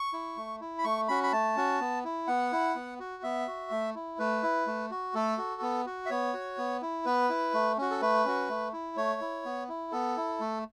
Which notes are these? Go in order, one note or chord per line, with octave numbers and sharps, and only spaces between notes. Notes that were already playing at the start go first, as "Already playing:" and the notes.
Already playing: C#6
E4
A3
E4
B5
A3 C#6
C#4 F#4 B5
B5
A3 A5
C#4 F#4
B3
E4
B3 F#5
E4
B3
F#4
B3 E5
F#4
A3
E4
A3 B4
E4
A3
F#4
A3 A4
F#4
B3
F#4
E5
B3 C#5
F#4
B3
E4
B3 B4
E4
A3
C#4 F#4
A4
A3 B4
C#4 F#4
A3
E4
A3 C#5
E4
B3
E4
B3 A4
E4
A3